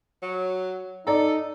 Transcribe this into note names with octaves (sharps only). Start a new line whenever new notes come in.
F#3
D#4 A4 D5 A#5